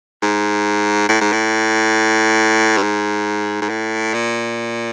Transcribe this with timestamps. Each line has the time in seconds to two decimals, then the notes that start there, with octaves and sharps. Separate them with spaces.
0.23 G#2
1.09 A2
1.21 G#2
1.32 A2
2.78 G2
2.83 G#2
3.62 G#2
3.69 A2
4.14 A#2